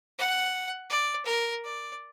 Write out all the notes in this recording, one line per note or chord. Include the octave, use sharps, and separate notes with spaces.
F#5
D5
A#4
D5